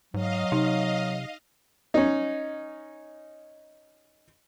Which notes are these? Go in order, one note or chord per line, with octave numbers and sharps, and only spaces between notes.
G#2 F#3 D#5 F5
C3 D#4
C#4 D#4